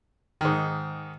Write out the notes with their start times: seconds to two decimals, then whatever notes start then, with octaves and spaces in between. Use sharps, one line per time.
0.41 G#2 D#3